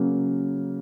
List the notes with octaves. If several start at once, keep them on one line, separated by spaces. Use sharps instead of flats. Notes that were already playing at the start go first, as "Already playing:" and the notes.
Already playing: C#3 F#3 A#3